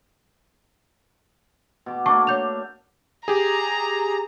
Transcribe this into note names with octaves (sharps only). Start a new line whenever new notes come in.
B2 D6
A3 A#3 D4 A5 C#6 D6
C#5 G6 F7
G4 G#4 A#5